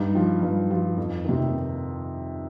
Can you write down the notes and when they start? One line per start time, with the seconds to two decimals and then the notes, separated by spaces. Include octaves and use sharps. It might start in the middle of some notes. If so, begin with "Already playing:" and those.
Already playing: G2 D#4
0.15 F3
0.42 G2
0.71 F3
0.98 F2
1.25 C3 D#3